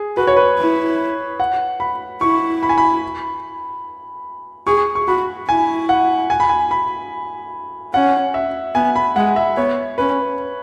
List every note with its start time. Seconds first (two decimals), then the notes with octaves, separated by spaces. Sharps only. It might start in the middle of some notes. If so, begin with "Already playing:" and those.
Already playing: G#4
0.17 F#4 B4
0.27 C#5
0.37 B4
0.58 E4
1.40 F#5
1.80 B5
2.21 E4 C#6
2.63 B5
2.69 G#5
2.78 B5
4.67 G#4 C#6
4.95 C#6
5.08 F#4 B5
5.49 E4 G#5
5.89 F#5
6.30 G#5
6.40 B5
6.49 G#5
6.71 B5
7.94 C#4 F#5
8.34 E5
8.75 B3 G#5
8.96 B5
9.16 G#3 F#5
9.36 E5
9.57 B3 C#5
9.98 C#4 B4